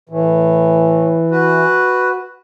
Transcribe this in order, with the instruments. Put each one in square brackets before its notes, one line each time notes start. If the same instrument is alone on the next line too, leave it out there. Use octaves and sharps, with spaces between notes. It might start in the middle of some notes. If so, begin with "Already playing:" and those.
[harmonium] A2 [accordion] E3
[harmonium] F#4 B4